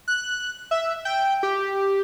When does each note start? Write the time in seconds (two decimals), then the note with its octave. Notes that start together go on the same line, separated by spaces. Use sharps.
0.08 F#6
0.71 E5
1.05 G5
1.43 G4